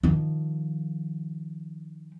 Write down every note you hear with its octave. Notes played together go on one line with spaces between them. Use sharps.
D#3 F3